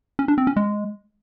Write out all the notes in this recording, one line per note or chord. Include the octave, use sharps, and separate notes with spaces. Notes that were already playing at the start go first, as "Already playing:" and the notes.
C#4
D4
C4
C#4
G#3